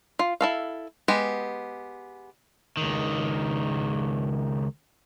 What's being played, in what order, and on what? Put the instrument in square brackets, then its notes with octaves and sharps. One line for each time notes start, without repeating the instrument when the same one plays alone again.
[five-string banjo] F4
E4 A4 F5
G#3 B3 G4
[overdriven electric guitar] C#2 D#3